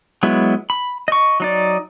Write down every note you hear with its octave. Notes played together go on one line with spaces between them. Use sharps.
F#3 G#3 B3 E4
B5
D#5 C#6
F#3 D#4 D5